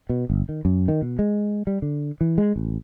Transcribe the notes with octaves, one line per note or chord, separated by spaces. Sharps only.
B2
G1
D#3
F#2
D#3
B2
G#3
G3
D3
E3
G#3
A1